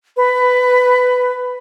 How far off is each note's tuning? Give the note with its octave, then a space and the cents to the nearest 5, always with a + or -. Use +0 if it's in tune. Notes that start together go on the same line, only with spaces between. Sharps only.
B4 +15